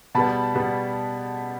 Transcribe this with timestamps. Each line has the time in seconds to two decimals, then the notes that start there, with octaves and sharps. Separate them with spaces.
0.15 B2 G3 B3 A5 B5
0.55 B2 G3 B3